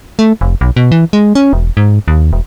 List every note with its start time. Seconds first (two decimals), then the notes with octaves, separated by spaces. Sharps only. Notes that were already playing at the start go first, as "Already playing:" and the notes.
0.19 A3
0.41 F1
0.61 B1
0.76 B2
0.92 E3
1.13 G#3
1.35 C#4
1.53 E1
1.77 G#2
2.08 D#2
2.33 E1